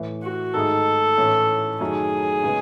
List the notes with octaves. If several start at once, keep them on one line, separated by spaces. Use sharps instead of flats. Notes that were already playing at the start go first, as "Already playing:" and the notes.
Already playing: A2 E3 A3
F#4
G#2 D#3 A3 D#4 G#4 A4
A2 E3 A3 C#4
F#2 D#3 F#3 A3 G#4
C#3 G#3 B3